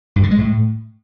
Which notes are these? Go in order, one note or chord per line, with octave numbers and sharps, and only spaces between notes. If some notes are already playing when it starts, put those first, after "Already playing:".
G2
D3
G#3
A2